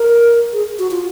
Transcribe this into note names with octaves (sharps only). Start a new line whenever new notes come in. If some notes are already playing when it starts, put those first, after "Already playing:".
Already playing: A#4
G#4
F#4
F4